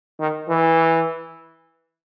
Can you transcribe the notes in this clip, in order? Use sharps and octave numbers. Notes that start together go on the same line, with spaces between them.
D#3
E3